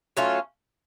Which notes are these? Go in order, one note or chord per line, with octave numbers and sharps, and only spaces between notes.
F#3 A3 C#4 F4